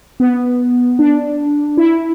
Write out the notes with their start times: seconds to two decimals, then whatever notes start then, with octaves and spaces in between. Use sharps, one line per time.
0.20 B3
0.99 D4
1.77 E4